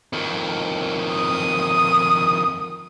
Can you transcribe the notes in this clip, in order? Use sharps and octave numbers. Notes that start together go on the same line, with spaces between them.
F2 D#3
D#6